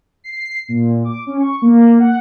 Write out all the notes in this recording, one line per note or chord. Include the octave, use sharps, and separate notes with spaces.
C7
A#2
D6
C#4
C#6
A#3
F#5